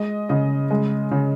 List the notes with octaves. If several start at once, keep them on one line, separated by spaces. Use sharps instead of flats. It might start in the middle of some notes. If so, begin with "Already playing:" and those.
Already playing: G#3 D#5
C#3 D#5
G#3
C#3